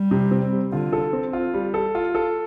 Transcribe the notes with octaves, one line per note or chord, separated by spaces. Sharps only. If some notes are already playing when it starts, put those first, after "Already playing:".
Already playing: G3
C3
C4
G3
D3 F4
A4
C4
F4
G3
A4
F4
A4